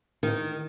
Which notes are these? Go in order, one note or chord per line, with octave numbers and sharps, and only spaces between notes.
D#3